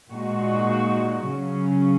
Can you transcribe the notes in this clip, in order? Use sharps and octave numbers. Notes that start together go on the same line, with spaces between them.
A#2 G#3 D#4 F#4
C#3 F#3 C#4